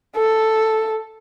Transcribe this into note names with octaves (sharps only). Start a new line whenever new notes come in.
A4